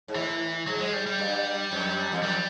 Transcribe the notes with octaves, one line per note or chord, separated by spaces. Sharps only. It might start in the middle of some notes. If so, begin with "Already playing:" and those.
G#2
A2 E3
G#2 F#3
G#3
G3
G3
G2
F2
E2
F2 G3